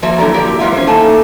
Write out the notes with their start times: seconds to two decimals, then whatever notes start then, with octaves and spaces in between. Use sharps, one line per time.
0.02 F3 A#3 F#4 D5 E5 A#5
0.18 A2 D3 F#3 A4 D5 A#5
0.34 F#3 A#3 G4 A#4 D5
0.59 E3 G3 G#3 B3 F4 E5
0.73 C#4 C5
0.87 A3 A#3 D#4 G#5 A5